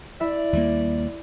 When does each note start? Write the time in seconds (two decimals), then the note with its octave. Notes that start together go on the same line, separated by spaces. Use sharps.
0.20 E4 D5 E5
0.53 D#2 G3 A#3